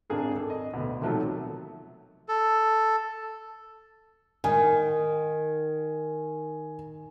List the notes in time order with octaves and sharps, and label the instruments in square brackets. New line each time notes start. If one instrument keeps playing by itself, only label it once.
[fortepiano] G#1 D4 G#4 A#4
A4
D#5
D2 B2
C3 D#3 F3 F#3 A3
[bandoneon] A4
[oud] D#3 [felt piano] G#5